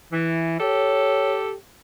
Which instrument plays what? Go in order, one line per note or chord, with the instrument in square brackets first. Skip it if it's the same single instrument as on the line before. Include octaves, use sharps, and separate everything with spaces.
[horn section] E3
[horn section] G4 A4 [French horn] C#5